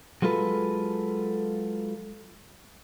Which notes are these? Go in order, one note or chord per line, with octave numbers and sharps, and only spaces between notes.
F#3 G#3 F4 A4 B4